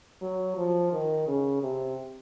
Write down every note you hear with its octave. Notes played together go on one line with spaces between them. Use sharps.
F#3
F3
D#3
C#3
C3